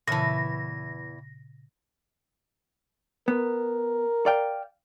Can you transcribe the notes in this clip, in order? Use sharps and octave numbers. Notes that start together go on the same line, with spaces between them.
E2 A#2 C#3 E3 A5 A#6
B3 A#4
D5 F5 G5